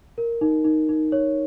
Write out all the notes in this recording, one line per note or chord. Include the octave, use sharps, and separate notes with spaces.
A#4
D#4
D#4
D#4
C#5